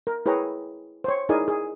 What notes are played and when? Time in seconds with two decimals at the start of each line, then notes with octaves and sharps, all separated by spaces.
0.07 A#4
0.26 E4 G#4 B4 C#5 G5 A#5
1.04 C5 C#5
1.29 D#4 E4 G#4 A#4 D5 G#5
1.48 G#4